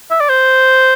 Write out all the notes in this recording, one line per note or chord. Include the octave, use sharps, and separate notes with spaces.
E5
D5
C5